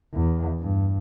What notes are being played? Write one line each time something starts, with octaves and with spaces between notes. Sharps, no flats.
E2
G2